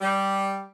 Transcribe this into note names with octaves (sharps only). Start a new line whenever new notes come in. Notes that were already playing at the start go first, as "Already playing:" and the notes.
G3